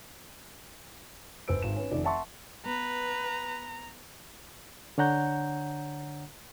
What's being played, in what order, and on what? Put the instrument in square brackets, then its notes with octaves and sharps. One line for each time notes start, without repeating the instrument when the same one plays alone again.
[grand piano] G1 B4 C5 E6 D7
G#1 E7
C#4 B4
F1 D#3 D5
E5 F#5 A5 C6 C#6
[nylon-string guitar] B3 [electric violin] B4 [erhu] A#5
[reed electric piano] D3 D4 C#5 F#5 A#5 G6